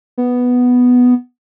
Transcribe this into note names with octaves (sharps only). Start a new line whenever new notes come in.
B3